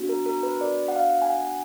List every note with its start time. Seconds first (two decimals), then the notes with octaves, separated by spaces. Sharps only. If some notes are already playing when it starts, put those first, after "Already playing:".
Already playing: B3 D4 F#4
0.09 A#4
0.26 A#4
0.43 B4
0.61 D5
0.88 F#5
0.96 F5
1.22 G#5
1.30 F#5